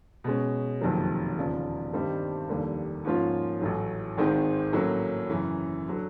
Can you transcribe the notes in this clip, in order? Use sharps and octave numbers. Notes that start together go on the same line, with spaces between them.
B2 G#3 C#4
F#1 F2 C3 D#3 F#3
E1 D#2 C#3 F3
G2 D#3 G3 C4 D#4
F1 D#2 D3 G3 A#3
G#2 F3 A#3 C#4 F4
A1 A2 F#3
G#1 G#2 D#3 G#3 C4
A2 F#3 A#3 C#4
F#2 C#3 E3
D3 F#3